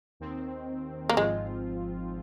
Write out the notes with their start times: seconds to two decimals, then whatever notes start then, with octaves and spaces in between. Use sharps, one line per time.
0.20 D#2 D#3 C4
1.09 A#3
1.16 G#1 G#2 F3 G#3 C4 F4